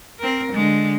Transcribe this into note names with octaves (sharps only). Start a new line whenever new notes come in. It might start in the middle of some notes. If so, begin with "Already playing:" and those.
C4 A#4
D3 G#3